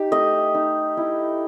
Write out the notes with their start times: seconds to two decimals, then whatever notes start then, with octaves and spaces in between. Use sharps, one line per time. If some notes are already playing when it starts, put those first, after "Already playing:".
Already playing: D#4 G4
0.12 A3 D#5
0.55 D#4
0.97 E4